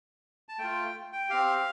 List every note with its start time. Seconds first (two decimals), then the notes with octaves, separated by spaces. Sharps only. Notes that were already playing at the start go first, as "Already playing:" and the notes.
0.49 A5
0.58 A3 F4 G5
1.13 G5
1.29 C4 G4 F5